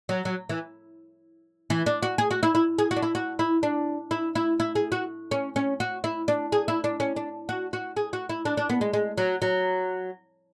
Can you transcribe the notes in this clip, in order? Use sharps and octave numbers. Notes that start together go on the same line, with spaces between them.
F#3
F#3
E3
E3
D4
F#4
G#4
F#4
E4
E4
G#4
F#4
D4
E4
F#4
E4
D4
E4
E4
E4
G#4
F#4
C#4
C#4
F#4
E4
D4
G#4
E4
D4
C#4
D4
F#4
F#4
G#4
F#4
E4
D4
D4
B3
G#3
G#3
F#3
F#3